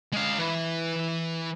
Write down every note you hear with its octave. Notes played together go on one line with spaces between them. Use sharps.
G#3 F5
E3